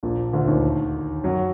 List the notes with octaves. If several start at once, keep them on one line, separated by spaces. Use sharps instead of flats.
A#1 A#2
D2 D3
D#2 D#3
F#2 F#3